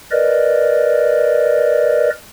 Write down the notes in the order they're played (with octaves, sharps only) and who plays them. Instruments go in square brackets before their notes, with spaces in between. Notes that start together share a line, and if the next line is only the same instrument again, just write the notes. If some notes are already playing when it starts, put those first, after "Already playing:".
[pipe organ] A#4 B4 D5 D#5